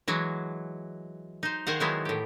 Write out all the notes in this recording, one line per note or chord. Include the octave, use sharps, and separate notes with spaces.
E3 F#3 G#3
D#4 C5
D#3 G#4 C5 D#5 F5 F#5
D#3 F#3 G#3 B3 E4
A2 G4